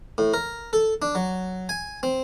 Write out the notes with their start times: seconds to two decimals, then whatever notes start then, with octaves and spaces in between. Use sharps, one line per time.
0.18 A2
0.34 A#4
0.73 A4
1.02 D4
1.15 F#3
1.69 G#5
2.03 C4